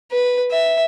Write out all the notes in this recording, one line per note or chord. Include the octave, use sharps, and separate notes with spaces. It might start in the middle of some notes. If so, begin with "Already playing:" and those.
B4
E5